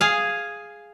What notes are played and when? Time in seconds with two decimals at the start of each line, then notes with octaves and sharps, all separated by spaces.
0.01 G#4 F5